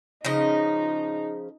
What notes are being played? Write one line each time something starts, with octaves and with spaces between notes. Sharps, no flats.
C#3 F3 D#4 D#5